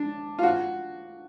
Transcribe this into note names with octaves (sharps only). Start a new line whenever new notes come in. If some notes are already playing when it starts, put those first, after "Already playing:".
Already playing: D4
F4
F#4